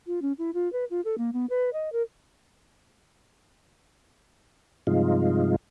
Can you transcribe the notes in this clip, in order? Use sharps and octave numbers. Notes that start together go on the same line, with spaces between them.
F4
C#4
E4
F4
B4
F4
A4
A#3
B3
B4
D#5
A#4
G2 C3 F3 G#3 D#4 F4